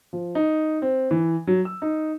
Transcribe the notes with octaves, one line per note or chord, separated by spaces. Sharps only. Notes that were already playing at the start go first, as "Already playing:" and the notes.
F3
D#4
C4
E3
F#3
E6
D#4